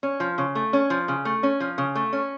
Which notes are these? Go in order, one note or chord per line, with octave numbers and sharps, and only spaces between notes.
C#4
F3
C#3
A3
C#4
F3
C#3
A3
C#4
F3
C#3
A3
C#4